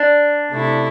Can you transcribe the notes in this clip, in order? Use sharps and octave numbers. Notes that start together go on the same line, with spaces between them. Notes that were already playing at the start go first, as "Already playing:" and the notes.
Already playing: D4
C3 A3 E4